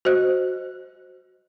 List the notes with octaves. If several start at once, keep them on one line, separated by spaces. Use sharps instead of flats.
F#4 C5 D#5 F#6